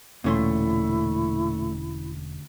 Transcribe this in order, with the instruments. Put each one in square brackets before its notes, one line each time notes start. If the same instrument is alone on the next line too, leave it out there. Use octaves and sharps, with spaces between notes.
[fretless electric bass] E1 [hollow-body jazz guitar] D2 C#4 C6 [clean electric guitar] A#2 A3 [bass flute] E4